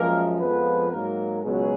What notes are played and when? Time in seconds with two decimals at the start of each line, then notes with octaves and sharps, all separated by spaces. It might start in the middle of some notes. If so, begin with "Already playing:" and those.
Already playing: F#2 F3 G#3 A#3 A#4
0.40 F2 F3 G#3 B3 B4
0.91 G#2 F#3 A#3 A#4
1.42 C#2 B2 F#3 G#3 G#4